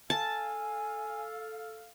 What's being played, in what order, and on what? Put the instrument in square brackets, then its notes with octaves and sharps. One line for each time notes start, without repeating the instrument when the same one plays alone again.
[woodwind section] A4 F5 [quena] G#5 [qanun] A5